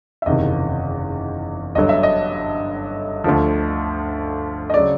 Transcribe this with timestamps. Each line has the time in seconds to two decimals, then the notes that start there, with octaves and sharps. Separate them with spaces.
0.22 E5
0.26 F#1 E2 C3 D#3 D#5
1.75 G1 G2 D3 F#3 D#5
1.89 E5
2.03 D#5
3.24 D2 D3 F3
4.70 D#5
4.74 C#3 F#3 D5